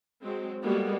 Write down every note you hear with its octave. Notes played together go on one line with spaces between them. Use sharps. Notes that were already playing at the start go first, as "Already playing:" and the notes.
F#3 G#3 C4
G3 G#3 A#3 B3 F#4 A4